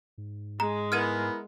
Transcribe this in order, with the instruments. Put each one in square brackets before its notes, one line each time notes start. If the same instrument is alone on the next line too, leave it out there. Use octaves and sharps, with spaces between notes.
[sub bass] G#2
[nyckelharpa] G#3 G#4 [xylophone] A#5
[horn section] B3 E4 A#4 [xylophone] F6 G#6 D#7